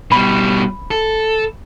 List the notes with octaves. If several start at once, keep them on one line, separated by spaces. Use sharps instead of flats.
B2 G3 B5
A4